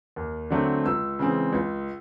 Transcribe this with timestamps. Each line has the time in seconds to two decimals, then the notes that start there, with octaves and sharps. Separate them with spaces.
0.16 D#2
0.50 D3 F#3 A3 C4
0.85 C#2 E6
1.19 C#3 E3 G#3 C4
1.53 C#2